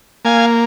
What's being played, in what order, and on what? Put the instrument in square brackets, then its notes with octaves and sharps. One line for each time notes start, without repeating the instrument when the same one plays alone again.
[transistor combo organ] A#3 F5 G#5